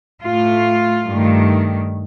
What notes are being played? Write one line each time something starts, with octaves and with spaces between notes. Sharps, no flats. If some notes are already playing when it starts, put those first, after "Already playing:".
A2 A3 F4
G2 D#3 A3